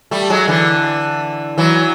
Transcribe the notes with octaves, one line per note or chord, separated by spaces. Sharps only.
G3 A3
F#3 G#3
D3 E3
E3 F#3